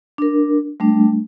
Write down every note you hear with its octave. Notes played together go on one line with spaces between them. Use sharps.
D4 A#4
G3 A3 D4